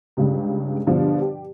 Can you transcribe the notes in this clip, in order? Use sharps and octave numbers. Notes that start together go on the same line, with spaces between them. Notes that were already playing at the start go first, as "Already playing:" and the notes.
C#2 G2 C#3 G3 G4
G2 B2 D3 F3
G4